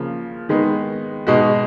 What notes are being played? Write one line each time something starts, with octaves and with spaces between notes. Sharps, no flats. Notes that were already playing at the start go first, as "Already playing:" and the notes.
Already playing: C#3 F3 A#3
D#3 G#3 B3 D#4
B2 G#3 D#4 F#4